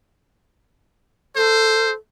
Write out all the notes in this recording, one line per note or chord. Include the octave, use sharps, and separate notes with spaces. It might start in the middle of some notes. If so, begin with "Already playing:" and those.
A4 C5